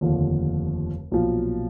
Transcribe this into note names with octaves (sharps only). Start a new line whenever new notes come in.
F1 D#2 D3 F3
B1 A#2 F3